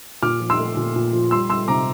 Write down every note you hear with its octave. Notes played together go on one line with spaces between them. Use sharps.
A#2 D6 F6
F3
C6 E6
A3
A#2
A#2
F3
G3 C6 E6
G3 C6 E6
C3 A#5 D6